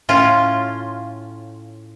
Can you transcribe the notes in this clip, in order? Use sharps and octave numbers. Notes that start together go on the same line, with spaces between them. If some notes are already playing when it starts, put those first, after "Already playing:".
A2 C#4 F4